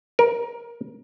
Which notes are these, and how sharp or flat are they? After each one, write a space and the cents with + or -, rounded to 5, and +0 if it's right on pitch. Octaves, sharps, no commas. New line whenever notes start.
A#4 +20